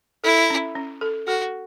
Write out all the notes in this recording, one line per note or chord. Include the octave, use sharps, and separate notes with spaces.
E4 A4
C#4
C#4
A4
F#4 A4